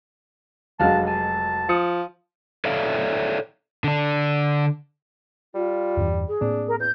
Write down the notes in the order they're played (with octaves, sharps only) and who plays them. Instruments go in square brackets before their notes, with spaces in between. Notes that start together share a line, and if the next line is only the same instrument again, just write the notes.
[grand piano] F1 F#3 G#3 [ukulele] D4 F#4 F5 [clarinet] A5
[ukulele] G#5 [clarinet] A5
[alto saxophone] F3 [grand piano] D#6 C#7
[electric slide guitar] A4 C#5 D5 E5 F5
D3 D4
[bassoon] G3 [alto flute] F4
[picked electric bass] E2 G2 E3
[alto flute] G#4
[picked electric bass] A2 A#3 C4 [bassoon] D4
[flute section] A#4
[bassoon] E2 [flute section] G6